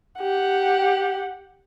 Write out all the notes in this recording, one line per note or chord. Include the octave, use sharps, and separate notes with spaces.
G4 F#5